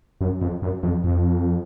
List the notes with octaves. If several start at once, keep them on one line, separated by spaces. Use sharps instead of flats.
F#2
F2
F#2
F2
F2